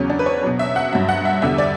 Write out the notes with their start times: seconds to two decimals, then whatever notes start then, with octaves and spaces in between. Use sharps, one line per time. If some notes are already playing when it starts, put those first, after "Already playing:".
Already playing: E2 C#3 F#3 C#4
0.10 D4
0.19 B4
0.26 C#5
0.43 B2 F#3
0.59 E5
0.76 F#5
0.92 G2 F#3 E5
1.09 F#5
1.25 E5
1.42 E2 D3 G3 E5
1.58 D5